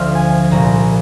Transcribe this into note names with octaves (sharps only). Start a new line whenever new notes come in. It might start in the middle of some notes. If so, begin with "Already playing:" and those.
Already playing: D2 D3 F3 F5
G#5
C2 A#2 F3 A#5